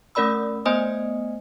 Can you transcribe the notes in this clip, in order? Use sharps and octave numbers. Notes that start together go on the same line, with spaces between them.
A3 C#4 A#4 D5 B5 E6
A3 B3 C5 D#5 G#5 D#6